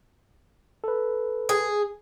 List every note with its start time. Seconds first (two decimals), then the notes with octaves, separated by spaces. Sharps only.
0.84 A4 B4
1.49 G#4